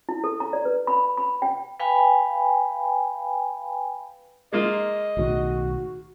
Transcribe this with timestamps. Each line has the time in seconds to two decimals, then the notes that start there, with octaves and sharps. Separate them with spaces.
0.09 E4
0.24 A4
0.40 A#5
0.53 D5
0.65 B4
0.87 B5
1.17 B5
1.42 G5
1.80 B4 F5 G5 G#5 B5
4.53 G#3 A#3 F4 D#5
5.17 B1 A2 D#3 F#4